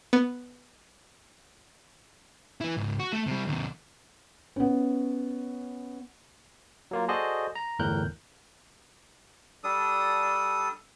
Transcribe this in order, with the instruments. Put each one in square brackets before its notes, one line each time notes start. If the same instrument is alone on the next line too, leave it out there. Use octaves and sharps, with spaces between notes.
[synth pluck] B3
[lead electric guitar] E4 B4
C#2 G#2
F#4
A3
C3 G3
D#2 C3
[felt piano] B3 C#4
[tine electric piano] F#3 A#3 F4
F#4 G#4 A4 C5 D5 D#5
A#5
G1 E2 A2 A#4 F#6 G6
[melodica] G3 D4 A4 D#6